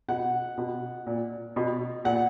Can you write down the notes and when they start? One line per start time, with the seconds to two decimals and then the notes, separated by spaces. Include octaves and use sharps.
0.08 B2 F#5
0.58 B2
1.07 A#2
1.56 B2
2.05 A#2 F#5